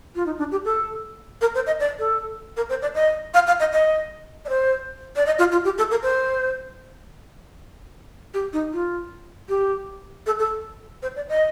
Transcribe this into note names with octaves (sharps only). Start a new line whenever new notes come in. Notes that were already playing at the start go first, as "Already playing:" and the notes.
F4
D#4
D4
G4
A4
A#4
C5
D#5
D5
A4
A#4
C5
D5
D#5
F5
F5
D#5
D#5
D5
C5
D5
D#5
F4
F4
G4
A4
A#4
C5
G4
D#4
F4
G4
A4
A4
C5
D5
D#5